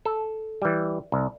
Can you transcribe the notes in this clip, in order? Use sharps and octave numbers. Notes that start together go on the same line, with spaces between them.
A4
E3 G3
C2